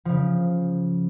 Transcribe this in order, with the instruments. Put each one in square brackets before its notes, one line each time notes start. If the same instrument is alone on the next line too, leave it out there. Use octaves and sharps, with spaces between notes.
[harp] C#3 F3